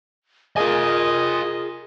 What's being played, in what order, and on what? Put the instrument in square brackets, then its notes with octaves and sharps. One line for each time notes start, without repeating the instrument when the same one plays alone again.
[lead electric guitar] F4 G#5 [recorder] G#4 [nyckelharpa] A#4 D#5